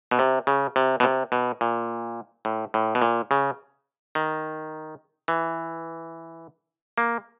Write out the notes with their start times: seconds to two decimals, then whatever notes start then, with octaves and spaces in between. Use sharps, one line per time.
0.11 B2
0.19 C3
0.47 C#3
0.76 C3
1.00 B2
1.03 C3
1.32 B2
1.61 A#2
2.45 A2
2.74 A2
2.95 B2
3.02 A#2
3.31 C#3
4.15 D#3
5.28 E3
6.98 A#3